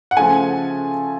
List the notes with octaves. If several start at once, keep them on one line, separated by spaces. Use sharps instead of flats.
F#5
C#3 F3 A3 G#5